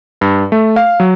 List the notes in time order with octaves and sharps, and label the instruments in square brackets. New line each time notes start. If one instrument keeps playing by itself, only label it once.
[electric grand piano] G2
A3
F5
F#3